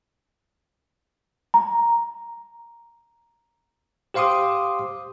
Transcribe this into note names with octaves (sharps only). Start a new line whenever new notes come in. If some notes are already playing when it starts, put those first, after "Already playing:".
A#5
G4 C5 F5 C6 D6 D#6